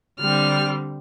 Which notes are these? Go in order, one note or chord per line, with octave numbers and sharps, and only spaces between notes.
D3 G3 C4 F6